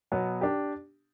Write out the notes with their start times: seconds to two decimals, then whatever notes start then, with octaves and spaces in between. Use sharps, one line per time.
0.12 B2 F#3 B3
0.41 D4 G4